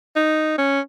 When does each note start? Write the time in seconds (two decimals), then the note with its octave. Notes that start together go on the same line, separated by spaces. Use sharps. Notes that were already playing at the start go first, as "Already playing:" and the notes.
0.16 D#4
0.58 C#4